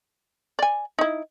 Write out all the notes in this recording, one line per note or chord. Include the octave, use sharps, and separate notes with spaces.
D5 G#5
D#4 E4